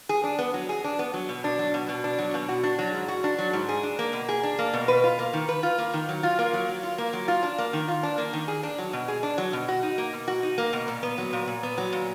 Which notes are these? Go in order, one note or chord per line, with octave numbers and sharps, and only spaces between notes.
G#4
D4
B3
F#3
G#4
D4
B3
F#3
B2
D4
F#3
B2
B2
D4
F#3
B2
F#4
D4
F#3
G#2
F#4
D4
F#3
G#2
G#4
D4
A#3
B2
G#4
D4
A#3
B2
B4
F4
A#3
D#3
B4
F4
A#3
D#3
F#3
F4
A#3
F#3
F#3
F4
A#3
F#3
F4
D4
A#3
D#3
F4
D4
A#3
D#3
G#4
D4
F#3
B2
G#4
D4
F#3
B2
F#4
D#4
A#3
B2
F#4
D#4
A#3
B2
A#2
B3
F#3
A#2
A#2
B3
F#3
A#2